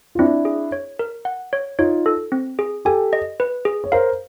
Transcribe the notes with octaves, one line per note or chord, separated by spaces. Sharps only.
F4
C4 D4 E4
G#4
C#5
A#4
F#5
C#5
D#4 F4 C#5
A4
C4
G#4
G4 A4 G#5
D#5
B4
G#4
C#5
A#4 C5 F5